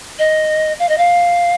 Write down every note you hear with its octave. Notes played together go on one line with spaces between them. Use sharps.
D#5
F5
D#5
F5